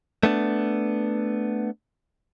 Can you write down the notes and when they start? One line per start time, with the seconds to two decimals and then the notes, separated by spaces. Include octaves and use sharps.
0.23 A3 B3 D4